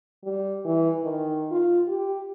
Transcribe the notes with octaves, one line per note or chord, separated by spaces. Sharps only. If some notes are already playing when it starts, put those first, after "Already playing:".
G3
E3
D#3
F4
G4